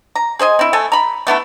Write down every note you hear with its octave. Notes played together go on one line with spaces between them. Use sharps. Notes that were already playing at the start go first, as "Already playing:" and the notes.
A#5
G#4 C5 D#5 G#5
C4 E4
A3 A4 G#5
A#5 B5
A3 B3 E4 A4